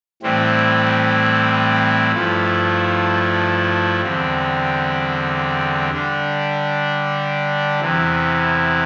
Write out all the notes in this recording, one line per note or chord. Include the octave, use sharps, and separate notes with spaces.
A2 E3 G3 C4
G2 F3 A3 E4
E2 D3 G3 C4
D3 G3 D4
E2 C3 E3